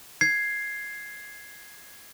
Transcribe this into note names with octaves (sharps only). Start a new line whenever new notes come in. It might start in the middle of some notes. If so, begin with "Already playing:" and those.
G#6 C7